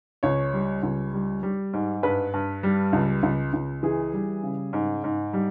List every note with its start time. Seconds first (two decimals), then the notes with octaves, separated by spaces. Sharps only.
0.23 C#2 C#5
0.53 G3
0.83 C#2
1.13 G3
1.43 G3
1.73 G#2
2.03 G2 B4
2.34 G2
2.63 G3
2.93 C#2
3.23 C#2
3.53 C#2
3.83 E3 G#4
4.13 G3
4.43 C#3
4.73 G#2
5.04 G#2
5.33 G3